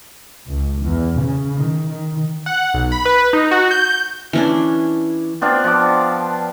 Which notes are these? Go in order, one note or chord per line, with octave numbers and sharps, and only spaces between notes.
C#2
E2
C#3
D#3
D#3
F#5
B1
B5
B4
D#4
F#4
G6
E3 C#4 D4
B3 C4 D4 F4
F3 D6